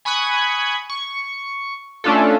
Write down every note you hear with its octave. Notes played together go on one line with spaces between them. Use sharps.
G#5 B5 C#6 D#6 F#6 G#6
C#6
A3 C#4 D4 F4 A4